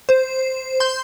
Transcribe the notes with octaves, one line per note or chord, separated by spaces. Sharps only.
C5
C6 G6